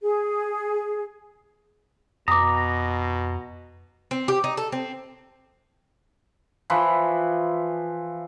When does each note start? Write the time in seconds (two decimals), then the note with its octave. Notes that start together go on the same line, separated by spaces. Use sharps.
0.02 G#4
2.28 F2 B2 A#5 D6 D#6
4.11 C4
4.28 G4
4.44 D#4
4.57 A4
4.72 C4
6.70 E3 F3 B4